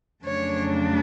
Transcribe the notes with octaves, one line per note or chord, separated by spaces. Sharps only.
F2 C#3 F#3 A3 D4 C#5